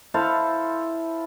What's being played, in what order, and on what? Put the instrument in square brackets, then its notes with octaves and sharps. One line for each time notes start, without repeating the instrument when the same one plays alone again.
[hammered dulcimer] E4 A4 C5 F5